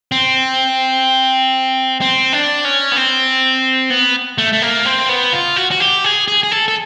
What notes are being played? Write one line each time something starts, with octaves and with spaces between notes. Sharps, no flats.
C4
C4
D4
C#4
B3
C4
B3
A3
A3
A#3
C4
B3
F4
F#4
F#4
G4
G#4
G#4
G#4
A4
A4